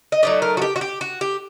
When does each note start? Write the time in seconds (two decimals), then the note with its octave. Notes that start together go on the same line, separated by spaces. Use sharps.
0.12 D#5
0.23 F#3 A3 D#4 D5
0.42 A#4
0.57 F#4
0.62 G4
0.76 F#4
0.81 G4
1.01 F#4
1.21 G4